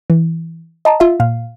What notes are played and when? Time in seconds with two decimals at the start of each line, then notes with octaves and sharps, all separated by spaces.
0.10 E3
0.85 D#5 A5 A#5
1.00 F4 E5
1.20 A#2 F5